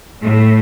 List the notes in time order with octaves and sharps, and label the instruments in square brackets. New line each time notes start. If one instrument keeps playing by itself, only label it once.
[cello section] A2 A3